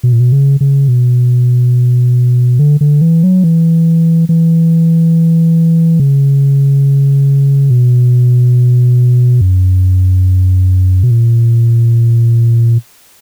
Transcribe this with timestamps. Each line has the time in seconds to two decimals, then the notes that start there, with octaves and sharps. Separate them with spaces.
0.03 B2
0.13 A#2
0.20 B2
0.32 C#3
0.61 C#3
0.88 B2
2.59 D3
2.81 D3
3.01 E3
3.23 F#3
3.44 E3
4.29 E3
6.00 C#3
7.70 B2
9.41 F#2
11.03 B2
11.11 A#2